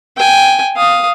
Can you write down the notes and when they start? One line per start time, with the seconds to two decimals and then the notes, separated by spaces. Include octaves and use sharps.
0.17 G5 G#5
0.77 F5 D#6